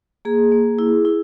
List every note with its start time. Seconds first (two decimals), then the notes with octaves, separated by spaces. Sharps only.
0.25 A#3 G#4
0.52 A#3
0.79 E4
1.05 E4